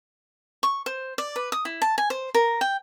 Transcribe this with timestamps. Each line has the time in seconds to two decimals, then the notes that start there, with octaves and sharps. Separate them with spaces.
0.63 C#6
0.86 C5
1.18 D5
1.36 B4
1.52 D#6
1.65 E4
1.82 A5
1.98 G#5
2.10 C5
2.35 A#4
2.61 G5